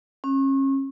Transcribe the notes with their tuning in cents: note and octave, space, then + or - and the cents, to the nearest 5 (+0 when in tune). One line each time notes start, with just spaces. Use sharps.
C#4 -35